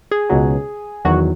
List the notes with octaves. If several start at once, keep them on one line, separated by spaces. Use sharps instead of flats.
G#4
C#2 B2 F#3
E2 D#3 F#3 F#4